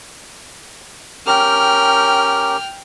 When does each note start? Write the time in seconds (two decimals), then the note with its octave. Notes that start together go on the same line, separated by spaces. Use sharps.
1.27 C#4 G4 A#4 G5 F6